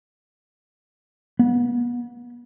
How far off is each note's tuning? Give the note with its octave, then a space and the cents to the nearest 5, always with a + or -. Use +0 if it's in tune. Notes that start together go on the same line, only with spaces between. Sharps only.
B3 -40